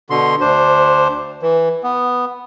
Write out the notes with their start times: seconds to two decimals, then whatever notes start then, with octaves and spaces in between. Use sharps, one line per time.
0.10 B2 D3 C6
0.41 D2 D4 C5
1.42 E3
1.84 B3